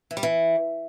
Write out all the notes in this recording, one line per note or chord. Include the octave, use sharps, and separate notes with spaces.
E3
G3
E3